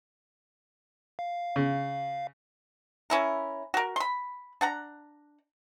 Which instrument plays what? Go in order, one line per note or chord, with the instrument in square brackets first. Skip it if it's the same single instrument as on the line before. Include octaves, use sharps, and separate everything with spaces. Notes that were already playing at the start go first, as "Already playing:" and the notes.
[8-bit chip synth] F5
[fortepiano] C#3
[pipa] C#4 E4 A#4
F#4 A#4
B5 C6
D4 F#5 A#5